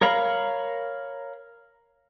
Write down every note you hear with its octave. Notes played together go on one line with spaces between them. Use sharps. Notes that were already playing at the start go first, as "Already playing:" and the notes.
A#4 C#5 F5 A#5 B5